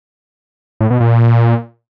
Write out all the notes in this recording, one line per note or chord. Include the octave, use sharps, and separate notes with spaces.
A2
B2
A#2